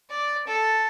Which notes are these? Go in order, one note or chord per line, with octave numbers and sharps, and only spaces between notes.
D5
A4